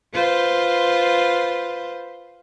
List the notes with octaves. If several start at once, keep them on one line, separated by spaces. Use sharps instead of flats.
F4 B4 C5